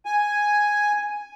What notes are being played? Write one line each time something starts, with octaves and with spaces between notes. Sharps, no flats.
G#5